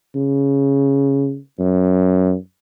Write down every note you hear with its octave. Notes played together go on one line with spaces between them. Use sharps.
C#3
F#2